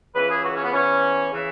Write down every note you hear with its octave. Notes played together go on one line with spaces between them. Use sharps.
C#2 C#3 E3 B4
G#4
F#4
C#4
B3
E2 E3 C#4
C#3 E3